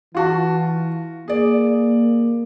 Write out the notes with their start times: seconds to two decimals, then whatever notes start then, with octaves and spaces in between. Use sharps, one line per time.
0.15 E3 F4 F#4 A5
1.28 A#3 G#4 D5